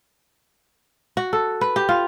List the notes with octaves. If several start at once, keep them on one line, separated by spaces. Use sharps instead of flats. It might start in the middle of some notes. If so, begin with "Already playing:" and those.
F#4
A4
B4
G4
F4